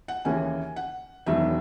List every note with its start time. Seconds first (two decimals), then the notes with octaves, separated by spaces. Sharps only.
0.08 F#5
0.25 D#2 C#3 E3 A#3 C#4 G#5
0.76 F#5
1.26 E1 E2 D#3 F#3 E5